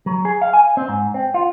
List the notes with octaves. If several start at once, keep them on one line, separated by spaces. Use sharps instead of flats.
F#3
G#4
F5
G#5
C4
G#2
C4
F4